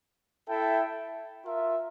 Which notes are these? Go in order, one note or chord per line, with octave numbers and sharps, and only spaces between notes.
E4 A4 E5 G5
F4 A#4 E5